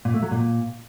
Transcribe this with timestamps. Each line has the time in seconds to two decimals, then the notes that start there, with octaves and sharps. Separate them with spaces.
0.05 A#2
0.14 A3
0.23 F#3
0.31 A#2